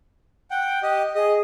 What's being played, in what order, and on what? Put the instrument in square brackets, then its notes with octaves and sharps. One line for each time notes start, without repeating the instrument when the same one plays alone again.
[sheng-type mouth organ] F#5 G5
G4 D#5
[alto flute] G#4 [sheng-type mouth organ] D#5